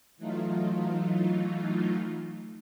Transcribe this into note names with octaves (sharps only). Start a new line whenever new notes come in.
E3 F#3 A3 D#4 F4